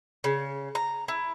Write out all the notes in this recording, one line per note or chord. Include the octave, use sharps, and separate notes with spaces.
C#3
A#5
E4